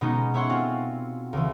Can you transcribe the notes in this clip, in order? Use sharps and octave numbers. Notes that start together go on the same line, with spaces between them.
B2 G#3 B3 C#4 D#4
C#4 E4 C#5 F#5 C6 C#6
C4 F4 F#4
C#2 C#3 E3